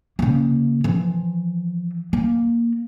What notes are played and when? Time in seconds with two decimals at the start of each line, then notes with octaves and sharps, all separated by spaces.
0.19 C#3 A#3
0.84 E3 F3
2.13 A#3